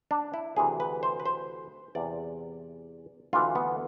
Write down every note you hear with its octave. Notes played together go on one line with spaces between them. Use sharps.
D4
E4
D2 C3 E3 G#4
B4
C5
B4
C5
E2 C3 E3 D5
D2 C3 E3 F4
B3